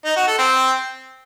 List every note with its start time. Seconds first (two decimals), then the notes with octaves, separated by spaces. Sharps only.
0.05 D#4
0.16 F#4
0.27 A4
0.39 C4